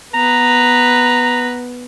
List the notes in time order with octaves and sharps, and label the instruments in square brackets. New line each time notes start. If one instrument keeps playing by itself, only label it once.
[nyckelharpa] B3 B4 [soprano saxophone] A#5